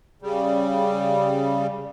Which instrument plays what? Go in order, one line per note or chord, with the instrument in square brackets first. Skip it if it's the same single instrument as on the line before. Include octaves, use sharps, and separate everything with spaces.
[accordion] C#3 G3